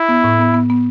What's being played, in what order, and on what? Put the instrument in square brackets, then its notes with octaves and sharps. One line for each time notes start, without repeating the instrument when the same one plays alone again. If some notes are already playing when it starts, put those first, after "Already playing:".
Already playing: [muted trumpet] E4
[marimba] B3
A2
B3
B3
B3